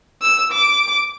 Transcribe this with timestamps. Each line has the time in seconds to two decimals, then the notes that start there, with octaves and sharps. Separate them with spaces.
0.22 E6
0.51 D6